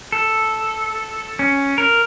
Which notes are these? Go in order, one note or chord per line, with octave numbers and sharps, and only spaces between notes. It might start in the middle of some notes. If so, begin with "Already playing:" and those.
A4
C#4
A#4